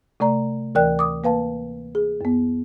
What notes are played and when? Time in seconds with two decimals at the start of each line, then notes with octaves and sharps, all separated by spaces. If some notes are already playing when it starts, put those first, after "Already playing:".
0.20 C3 A3 D5 A#5
0.75 D2 E3 A#4 D5 G5 F#6
0.99 D6 D#6
1.24 A#3 B4 F5 A5
1.95 G#4
2.21 F#2 B3